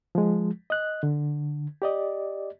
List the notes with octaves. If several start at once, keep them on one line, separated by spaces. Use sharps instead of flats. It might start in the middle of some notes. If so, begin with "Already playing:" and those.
F3 G#3
D#5 F#6
D3
G4 D5 D#5